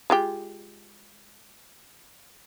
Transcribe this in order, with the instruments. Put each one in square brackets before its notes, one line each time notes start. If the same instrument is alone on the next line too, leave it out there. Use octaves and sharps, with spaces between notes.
[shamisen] G#3 F4 G4